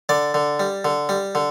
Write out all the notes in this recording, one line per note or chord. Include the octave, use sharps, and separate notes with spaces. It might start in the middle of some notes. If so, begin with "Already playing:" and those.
D3 D5
D3
G3
D3
G3
D3